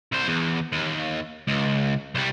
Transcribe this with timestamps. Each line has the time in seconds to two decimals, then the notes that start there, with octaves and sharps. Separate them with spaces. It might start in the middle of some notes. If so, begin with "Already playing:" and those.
0.12 C2 C5
0.28 E2
0.72 D#2
1.47 C#2
2.15 C2 G3